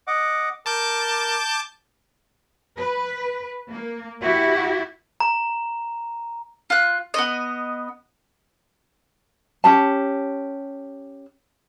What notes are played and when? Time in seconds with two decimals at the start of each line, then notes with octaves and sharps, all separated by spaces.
0.07 D#5 F#5 D6
0.66 A#4 A5 D6 G6
2.75 B4
3.70 A#3
4.22 E4 F#4 G4
5.20 A#5
6.70 F4 F#6
7.14 B3 C#4 D#5
9.64 C#4 G4 A5